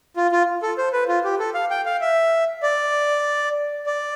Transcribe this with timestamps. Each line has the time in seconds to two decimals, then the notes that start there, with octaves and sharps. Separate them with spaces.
0.16 F4
0.32 F4
0.63 A4
0.78 C5
0.93 B4
1.08 F4
1.24 G4
1.39 A4
1.54 F5
1.70 G5
1.86 F5
2.01 E5
2.63 D5
3.86 D5